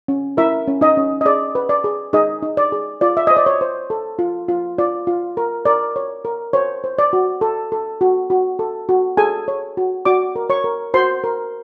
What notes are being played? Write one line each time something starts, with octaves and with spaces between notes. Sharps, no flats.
C#4
E4 A#4 E5
C#4
D#4 D#5
C#4
D#5
G#4 D5
B4
D5
G#4
D#4 G#4 D#5
D#4
D5
G#4
F4 D5
E5
C5 D#5
D5
C#5
C5
A4
F4
F4
F4 D5
F4
A#4
A#4 D5
C#5
A#4
C5 C#5
C5
D5
F#4
A4
A4
F#4
F#4
A4
F#4
G#4 A4 G#5
C#5
F#4
F#4 D5 D6
A#4
C#5 C#6
A#4
F#4 C5 C6
A#4